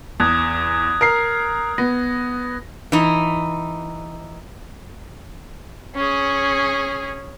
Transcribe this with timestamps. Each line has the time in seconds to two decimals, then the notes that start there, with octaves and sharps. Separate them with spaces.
0.20 E2 D#6 F#6 G#6
1.01 A#4 C7
1.78 B3 A#6
2.92 E3 D#4
5.95 C#4 G#4